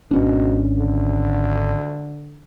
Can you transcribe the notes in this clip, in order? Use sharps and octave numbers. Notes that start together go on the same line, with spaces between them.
G#1 B2 C#4 D4
D3